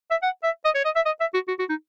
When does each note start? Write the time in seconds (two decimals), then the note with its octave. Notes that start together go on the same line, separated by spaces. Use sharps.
0.11 E5
0.23 F#5
0.43 E5
0.65 D#5
0.75 C#5
0.85 D#5
0.96 E5
1.06 D#5
1.20 E5
1.34 F#4
1.48 F#4
1.59 F#4
1.69 D#4